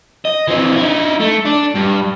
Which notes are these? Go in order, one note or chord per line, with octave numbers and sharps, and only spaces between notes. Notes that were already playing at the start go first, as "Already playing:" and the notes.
D#5
E3 C4
D#4 E4
A3
D4
G2